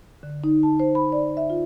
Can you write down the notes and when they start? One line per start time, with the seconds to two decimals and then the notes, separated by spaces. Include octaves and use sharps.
0.23 D3
0.44 D#4
0.63 A5
0.80 C5
0.95 B5
1.12 D5
1.37 E5
1.50 F4